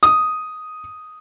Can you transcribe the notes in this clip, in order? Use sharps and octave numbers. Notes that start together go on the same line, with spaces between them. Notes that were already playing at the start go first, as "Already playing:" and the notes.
D#6